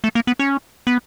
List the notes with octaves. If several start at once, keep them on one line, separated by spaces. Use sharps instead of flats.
A3
A#3
B3
C#4
B3